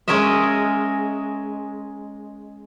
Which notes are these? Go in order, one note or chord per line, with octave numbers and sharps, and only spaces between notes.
G#3 C#4 A#4 D#5 E5